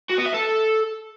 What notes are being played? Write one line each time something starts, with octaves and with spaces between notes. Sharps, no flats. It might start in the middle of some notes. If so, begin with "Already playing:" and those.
F#4
B3
E5
A4